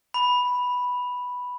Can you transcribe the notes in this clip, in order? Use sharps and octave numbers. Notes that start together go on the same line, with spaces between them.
B5